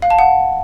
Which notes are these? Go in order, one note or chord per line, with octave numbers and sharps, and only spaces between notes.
F5
A5
F#5